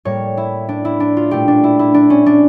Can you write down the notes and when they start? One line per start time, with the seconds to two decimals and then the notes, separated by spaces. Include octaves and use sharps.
0.05 A2 G3 A#3 C#5
0.37 E4
0.69 D4
0.85 E4
1.00 D4
1.17 F4
1.31 A#2 A3 G4
1.48 D4
1.64 E4
1.79 E4
1.94 D4
2.10 C#4
2.26 D4